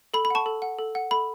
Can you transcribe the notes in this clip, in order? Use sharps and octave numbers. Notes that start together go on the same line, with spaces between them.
A4 B5
B5
F#5 A5 C#6
A4
F#5
A4
F#5
A4 B5